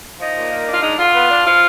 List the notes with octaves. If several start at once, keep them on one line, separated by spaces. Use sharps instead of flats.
F3 D#4
A#2
A#3
D4
F4
G#3 D#4
D3 F4
B3
D4
F3 F4